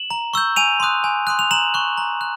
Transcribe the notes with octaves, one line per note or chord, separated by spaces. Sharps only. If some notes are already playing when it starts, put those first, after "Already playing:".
Already playing: E7 F#7
A#5
C#6 E6 G6
G#5 D#7 F7
C6 D#6 F#6
G#5
C6 D#6 F#6
F7
A#5 E7 F#7
C#6 F#6
A#5
F#6